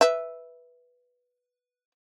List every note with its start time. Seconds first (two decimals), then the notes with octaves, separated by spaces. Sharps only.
0.01 B4 E5